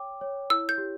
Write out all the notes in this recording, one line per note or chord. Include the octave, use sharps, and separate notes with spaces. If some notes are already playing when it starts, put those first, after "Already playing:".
Already playing: C#5 G5 D6
C#5
E4 E6
G6
G4